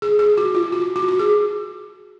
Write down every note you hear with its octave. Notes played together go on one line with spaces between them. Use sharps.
G#4
G#4
F#4
F4
F#4
F#4
F#4
G#4